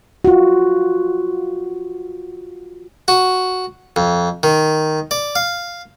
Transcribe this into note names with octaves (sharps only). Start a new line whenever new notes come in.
F4 F#4
F#4
F2
D#3
D5
F5